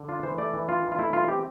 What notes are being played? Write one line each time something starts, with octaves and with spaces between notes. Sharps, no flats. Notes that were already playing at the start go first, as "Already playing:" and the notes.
Already playing: D3
D4 F4
E3 C5
A3 D5
E3
D4 F4
E3
F4
A3 E4
E3 F4
C4 G4